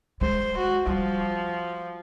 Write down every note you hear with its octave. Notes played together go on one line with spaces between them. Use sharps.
G#3 C5
F#4
F3 G3